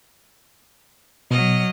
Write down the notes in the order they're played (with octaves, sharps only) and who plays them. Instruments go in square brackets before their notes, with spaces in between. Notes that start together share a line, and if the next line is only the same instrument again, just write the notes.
[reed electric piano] B2 [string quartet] F#3 D#5 F6